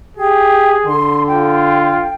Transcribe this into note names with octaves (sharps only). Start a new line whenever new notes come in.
G4 G#4
D3 C6
F4 G5